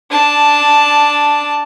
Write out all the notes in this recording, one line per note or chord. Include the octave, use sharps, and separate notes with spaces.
D4 A5